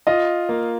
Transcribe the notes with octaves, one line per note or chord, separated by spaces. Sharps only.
F4 D#5
A#3